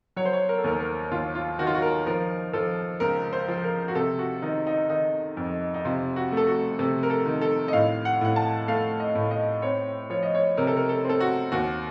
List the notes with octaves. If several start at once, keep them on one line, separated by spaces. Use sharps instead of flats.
F#3 C#5
C5
C#5
A#4
A4
D#2 A#4
A#4
D#2 F4
F4
D#3 F#4
F4
F#4
A#4
F3 A#4
F3 A4
C#2 A#4
C5
F3
A#4
F#4
C3 A4
F#4
D#3 D#4
D#4
D#3 D#4
F2
D#4
C3 F4
F#4
A3 A4
F#4
C3 A4
A#4
A4
D#3
A4
D#5
A2 F5
F#5
A2 F#5
A5
A3 F5
D#5
A2
D#5
C4 C#5
F3 C#5
D#5
C#5
C3 A#4
A4
A#4
A4
C4 A4
F#4
D#2 F#4